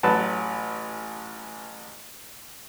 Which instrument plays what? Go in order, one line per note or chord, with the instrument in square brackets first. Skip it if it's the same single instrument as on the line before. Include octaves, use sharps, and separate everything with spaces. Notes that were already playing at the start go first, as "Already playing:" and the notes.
[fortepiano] A1 F#3 B4 A5